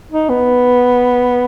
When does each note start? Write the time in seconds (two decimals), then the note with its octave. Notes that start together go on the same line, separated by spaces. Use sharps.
0.11 D#4
0.29 B3